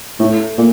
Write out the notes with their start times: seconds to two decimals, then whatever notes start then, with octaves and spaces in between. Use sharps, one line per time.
0.19 A2 A3
0.58 A#2